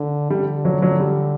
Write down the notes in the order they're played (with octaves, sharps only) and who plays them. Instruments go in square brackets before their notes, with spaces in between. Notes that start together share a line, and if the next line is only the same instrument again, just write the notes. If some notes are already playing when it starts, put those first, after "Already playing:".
Already playing: [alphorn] D3
[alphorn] D3 [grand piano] G3
[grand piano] F#3
F#3
G3